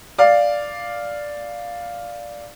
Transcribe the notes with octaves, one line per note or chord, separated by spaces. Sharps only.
D5 F5